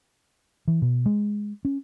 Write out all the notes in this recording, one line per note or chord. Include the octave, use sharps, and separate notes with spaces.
E3
B2
G#3
C#4